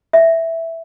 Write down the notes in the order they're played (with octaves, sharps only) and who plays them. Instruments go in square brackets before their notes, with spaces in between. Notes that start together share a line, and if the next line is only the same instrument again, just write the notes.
[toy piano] E5